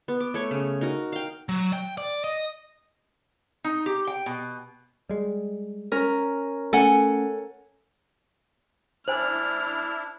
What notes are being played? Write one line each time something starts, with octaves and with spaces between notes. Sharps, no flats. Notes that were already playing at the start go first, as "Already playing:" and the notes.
B3
D6
A3 C#5 C#6
C#3
D#4 F#4 A#4
F5 G5
F#3
G5
D5
D#5
D#4
G4
G5
B2
G3 G#3
C#4 A#4
A3 C#4 A4 F#5 G#5
D4 E4 C5 G#5 F6